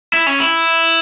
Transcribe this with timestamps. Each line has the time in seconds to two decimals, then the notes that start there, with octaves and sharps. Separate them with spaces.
0.13 E4
0.27 C#4
0.40 E4